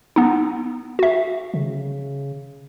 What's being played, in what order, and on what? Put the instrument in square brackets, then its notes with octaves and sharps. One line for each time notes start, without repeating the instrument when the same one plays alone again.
[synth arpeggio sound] B3 D#4
F#4 E5
[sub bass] C#3